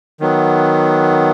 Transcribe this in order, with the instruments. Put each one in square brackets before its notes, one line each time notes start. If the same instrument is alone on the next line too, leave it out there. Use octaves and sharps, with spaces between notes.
[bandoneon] D#3 F#3 B3